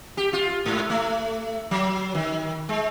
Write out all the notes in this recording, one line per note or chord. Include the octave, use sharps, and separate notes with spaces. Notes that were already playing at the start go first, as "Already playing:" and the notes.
G4
F4
G#2
A3
F#3
D#3
G#3